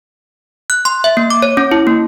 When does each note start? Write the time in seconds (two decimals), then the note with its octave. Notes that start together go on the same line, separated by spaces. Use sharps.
0.70 F#6
0.85 C6
1.04 E5
1.17 A#3
1.30 D6
1.42 C#5
1.57 C#4
1.71 E4
1.87 A#3